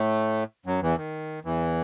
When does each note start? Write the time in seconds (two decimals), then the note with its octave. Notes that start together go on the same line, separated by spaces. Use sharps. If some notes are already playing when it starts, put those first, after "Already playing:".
Already playing: A2 A3
0.66 F#2 F#3
0.81 E2 E3
0.97 D#3
1.45 E2 E3